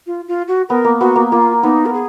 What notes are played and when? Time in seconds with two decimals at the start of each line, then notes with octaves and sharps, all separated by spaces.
0.07 F4
0.28 F4
0.48 F#4
0.69 B3 A#4
0.84 A#3
1.00 B3 F#4
1.16 A#3
1.31 A#3 F4
1.63 B3 D#4
1.86 A#4
1.93 G#4